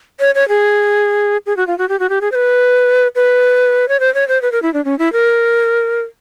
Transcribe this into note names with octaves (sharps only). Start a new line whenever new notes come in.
C#5
C#5
G#4
G#4
F#4
F4
F#4
G4
F#4
G4
G#4
C5
B4
B4
C#5
C5
C#5
C5
B4
A#4
E4
D4
C#4
E4
A#4